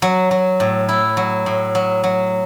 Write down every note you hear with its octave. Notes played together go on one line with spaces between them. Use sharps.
F#3
F#3
A2
E4
F#3
A2
F#3
F#3